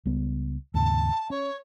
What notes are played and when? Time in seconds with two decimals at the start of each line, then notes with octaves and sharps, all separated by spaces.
0.06 C#2 G3 B3
0.74 D#2 G#2 C#3 A5
1.30 C#4 C#5